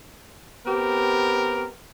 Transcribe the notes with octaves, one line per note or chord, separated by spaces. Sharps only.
B3 C4 G4 A#4